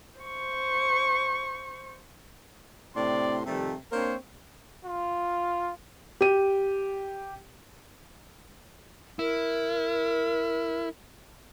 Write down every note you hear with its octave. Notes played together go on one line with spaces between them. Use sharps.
C5 C#6
A2 C3 C4 D4 D5 C6
C3 D#3 F3 G3 A3
A#3 C4 D4 A#4 C5 C#5
F4
G4 D#7
E4 A#4